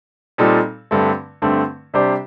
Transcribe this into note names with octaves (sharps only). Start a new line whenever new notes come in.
A#2 G3 C4 D#4 A4
G2 D3 A3 C4
G2 D3 A3 C4
C3 G3 D4 G4 C5